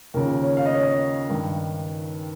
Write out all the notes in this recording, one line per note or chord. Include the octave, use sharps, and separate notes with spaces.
D#2 C#3 F3 A#4
C#5
F5
D#5
C#5
D#5
G2 D#3